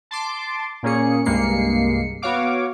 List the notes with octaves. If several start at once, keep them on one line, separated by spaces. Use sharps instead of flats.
A5 C6 D6
A#2 A#3 C#4 G#4 C#7
C2 G2 G#3 A#3 C7 C#7
B3 F#4 C#5 F5 D6